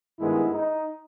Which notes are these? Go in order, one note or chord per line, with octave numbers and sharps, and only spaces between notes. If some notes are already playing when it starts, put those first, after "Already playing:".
G2 D#3 G#3 B3 E4
D#4